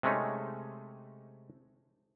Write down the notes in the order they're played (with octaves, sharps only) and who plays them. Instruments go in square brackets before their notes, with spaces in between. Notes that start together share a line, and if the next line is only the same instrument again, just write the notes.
[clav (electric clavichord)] C3 G#3 A3 C#4 D#4